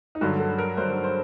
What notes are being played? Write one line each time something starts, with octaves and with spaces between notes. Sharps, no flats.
D#4
G2 D3 F#3 F#4
A4
A#4
G2 D3 F#3 C5
C5